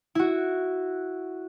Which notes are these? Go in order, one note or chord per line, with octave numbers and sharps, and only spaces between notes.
E4 F#4